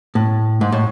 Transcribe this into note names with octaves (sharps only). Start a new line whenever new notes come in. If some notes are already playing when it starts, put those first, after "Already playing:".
A2
G#2
A2